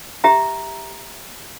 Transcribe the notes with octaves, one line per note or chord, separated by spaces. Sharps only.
G4 E5 A#5